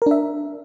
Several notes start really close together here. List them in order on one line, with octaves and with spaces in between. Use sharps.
A#4 D4 E5